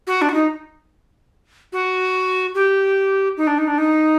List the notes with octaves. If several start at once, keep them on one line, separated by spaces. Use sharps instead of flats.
F#4
D4
F#4
D#4
F#4
G4
D#4
D4
D#4
D4
D#4